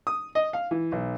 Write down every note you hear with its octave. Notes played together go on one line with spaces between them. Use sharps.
D#6
D#5
F5
E3
B1